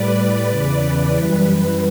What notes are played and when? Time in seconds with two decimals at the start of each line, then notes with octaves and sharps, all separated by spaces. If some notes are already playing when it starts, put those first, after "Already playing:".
Already playing: A2 G3 B4 D5
0.49 E2 C#3 E3
0.82 B4
1.15 F#2 E3 G3
1.47 B4